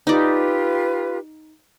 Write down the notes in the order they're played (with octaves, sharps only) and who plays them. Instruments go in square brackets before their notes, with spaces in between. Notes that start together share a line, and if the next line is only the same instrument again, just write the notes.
[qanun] D#4 D5 [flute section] F4 G4 B4